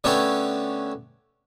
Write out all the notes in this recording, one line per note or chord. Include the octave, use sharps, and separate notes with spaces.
D3 A3 B3 C#4 G4 C#5